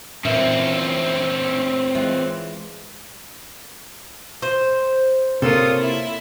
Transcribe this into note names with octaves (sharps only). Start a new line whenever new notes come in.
A#2 E3 C4 C#4 E4
E3 G#3 F4
C5
C3 A#3 F4 A4 C#5 D#6
E4 E5